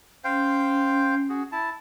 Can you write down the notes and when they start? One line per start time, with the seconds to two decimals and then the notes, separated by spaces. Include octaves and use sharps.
0.24 C#4 C5 F5 G5
1.29 F#4 G#4
1.52 E4 A5